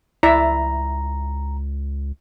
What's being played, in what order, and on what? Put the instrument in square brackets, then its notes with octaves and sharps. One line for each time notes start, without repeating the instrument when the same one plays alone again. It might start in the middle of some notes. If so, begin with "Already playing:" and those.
[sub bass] C#2 [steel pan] E4 D5 E5 [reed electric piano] A#5